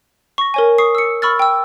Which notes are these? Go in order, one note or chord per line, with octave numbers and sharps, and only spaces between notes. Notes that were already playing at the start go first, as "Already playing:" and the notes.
C#6 A#6
A#4 C#5 G#5
C#6 D#6 C7
E6 C#7
B5 C#6 E6 F6 A6
G5 E6